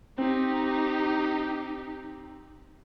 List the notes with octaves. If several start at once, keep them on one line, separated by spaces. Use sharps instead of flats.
C4 D#4 G4